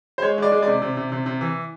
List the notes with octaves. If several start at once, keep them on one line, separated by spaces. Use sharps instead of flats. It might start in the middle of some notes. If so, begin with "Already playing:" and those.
C5
G#3 C#5
G#3 D5
G#3
C3 D5
C3
C3
C3
C3
E3